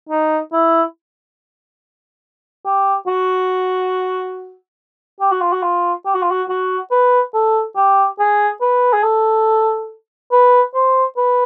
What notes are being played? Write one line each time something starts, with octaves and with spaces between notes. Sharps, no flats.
D#4
E4
G4
F#4
G4
F#4
F4
F#4
F4
G4
F#4
F4
F#4
F#4
B4
A4
G4
G#4
B4
G#4
A4
B4
C5
B4